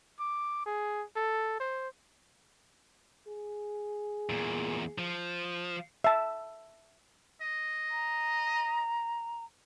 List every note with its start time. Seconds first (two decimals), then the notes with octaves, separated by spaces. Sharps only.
0.20 D6
0.66 G#4
1.16 A4
1.60 C5
3.28 G#4
4.29 E2 A#2
4.98 F3
6.04 E5 A5
7.42 D#5
7.91 A#5